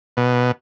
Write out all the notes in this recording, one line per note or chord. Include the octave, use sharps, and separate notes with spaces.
B2